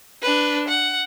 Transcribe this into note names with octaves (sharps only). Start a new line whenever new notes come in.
D4 B4
F#5